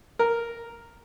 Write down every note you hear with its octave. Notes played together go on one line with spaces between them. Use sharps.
A#4